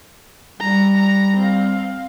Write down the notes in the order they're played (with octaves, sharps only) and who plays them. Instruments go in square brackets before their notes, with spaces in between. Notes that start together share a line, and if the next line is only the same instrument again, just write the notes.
[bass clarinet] G3 [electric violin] A#5
[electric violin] A#5
C4 F5